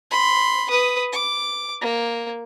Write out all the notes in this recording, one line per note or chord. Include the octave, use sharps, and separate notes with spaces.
B5 C6
B4 D#6
D6
A#3